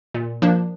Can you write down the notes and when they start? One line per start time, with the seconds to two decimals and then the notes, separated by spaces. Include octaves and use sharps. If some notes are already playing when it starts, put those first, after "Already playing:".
0.14 A#2
0.42 F3 A#3 D4